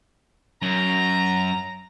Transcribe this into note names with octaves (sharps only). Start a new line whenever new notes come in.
F#2 A#5